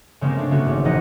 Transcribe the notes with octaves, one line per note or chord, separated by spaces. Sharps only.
C#3 G#3 A#3 C4 G4
A3 D4
C#3 G#3 B3 F#4
G#1 G#2
E1 A#1 D#4 D#5 F#5